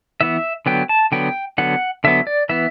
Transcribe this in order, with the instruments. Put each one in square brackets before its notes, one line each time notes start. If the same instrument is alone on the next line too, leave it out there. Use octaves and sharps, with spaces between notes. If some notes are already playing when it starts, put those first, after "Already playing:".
[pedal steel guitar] E3 B3 E5
D3 F#3 B3 G5
A5
D3 F#3 B3 G5
D3 F#3 B3 F#5
D3 F#3 B3 E5
D5
E3 B3 E5